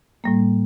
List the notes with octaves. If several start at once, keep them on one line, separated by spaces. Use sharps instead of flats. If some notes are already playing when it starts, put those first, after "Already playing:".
A2 G3 A#3